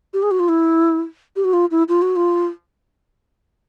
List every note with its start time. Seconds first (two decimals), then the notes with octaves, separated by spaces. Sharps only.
0.14 G4
0.23 G#4
0.31 F#4
0.40 F4
0.49 E4
1.36 G4
1.45 F#4
1.53 F4
1.71 E4
1.89 F4
2.02 F#4
2.16 F4